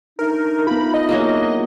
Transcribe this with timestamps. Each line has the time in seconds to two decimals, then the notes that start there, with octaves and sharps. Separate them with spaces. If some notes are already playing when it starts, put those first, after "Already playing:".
0.19 A3 D4 D#4 A#4
0.67 B3 F4 B5
0.94 D#5
1.09 F#3 G#3 A#3